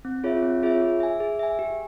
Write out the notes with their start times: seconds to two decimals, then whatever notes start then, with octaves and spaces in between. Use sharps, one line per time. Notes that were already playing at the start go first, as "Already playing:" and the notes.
0.05 C4
0.24 F4 G#4 C#5 E5
0.43 C4
0.63 F4 G#4 C#5 E5
0.81 G#4
1.00 E5 G#5
1.20 G#4
1.39 E5 G#5
1.59 G4